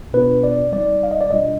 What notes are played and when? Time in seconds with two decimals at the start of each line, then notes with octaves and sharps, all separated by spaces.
0.13 B2 B3 D4 F4 B4
0.44 D5
0.72 G3 C4 D#4 D5
1.03 F5
1.11 D#5
1.21 D5
1.31 B2 G3 D4 F4 D#5